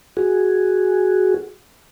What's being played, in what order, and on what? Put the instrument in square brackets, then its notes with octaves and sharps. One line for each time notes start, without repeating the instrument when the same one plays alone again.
[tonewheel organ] F#4 G#4